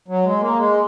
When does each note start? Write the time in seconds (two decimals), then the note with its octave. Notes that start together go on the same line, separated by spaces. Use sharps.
0.08 F#3
0.24 G#3
0.40 A#3
0.57 G#3